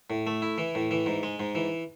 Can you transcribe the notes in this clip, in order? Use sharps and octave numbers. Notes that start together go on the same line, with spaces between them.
A2
A3
E4
E3
A2
E3
G#2
G#3
G#2
E3